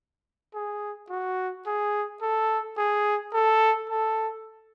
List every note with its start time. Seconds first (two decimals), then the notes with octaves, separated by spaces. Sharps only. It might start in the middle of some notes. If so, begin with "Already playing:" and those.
0.54 G#4
1.10 F#4
1.66 G#4
2.22 A4
2.77 G#4
3.33 A4
3.89 A4